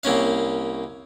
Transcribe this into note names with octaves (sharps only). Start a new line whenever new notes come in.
C2 A#3 C#4 F5